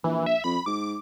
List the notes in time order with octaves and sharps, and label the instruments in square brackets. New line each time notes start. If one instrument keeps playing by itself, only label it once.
[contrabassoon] A#1 [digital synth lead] E3
[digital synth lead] E5
[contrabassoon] F2 [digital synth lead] B5
[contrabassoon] G#2 [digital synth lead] D6